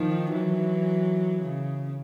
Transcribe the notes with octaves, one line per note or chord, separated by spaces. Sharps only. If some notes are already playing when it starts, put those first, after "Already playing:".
Already playing: D#3 F3
E3 F#3
C#3